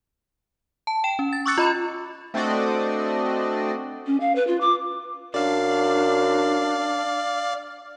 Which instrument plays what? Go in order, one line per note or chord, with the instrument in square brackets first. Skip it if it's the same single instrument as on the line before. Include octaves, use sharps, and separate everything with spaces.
[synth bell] A5
G5 E7
C#4
A6
C#6 D6 E6 F#6 A6 C#7
F4 D#5 B5 E7
[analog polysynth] A3 C4 D4 F#4 D5 D#5
[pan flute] C#4
F5
B4
F4
D6
[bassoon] F#2 [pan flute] D4 [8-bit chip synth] D5 F5